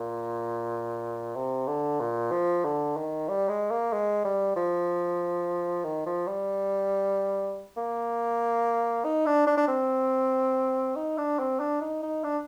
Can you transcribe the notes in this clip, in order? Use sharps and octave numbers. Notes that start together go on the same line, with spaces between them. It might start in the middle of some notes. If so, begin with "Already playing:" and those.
Already playing: A#2
C3
D3
A#2
F3
D3
D#3
G3
G#3
A#3
G#3
G3
F3
D#3
F3
G3
A#3
D#4
D4
D4
D4
C4
D#4
D4
C4
D4
D#4
D#4
D4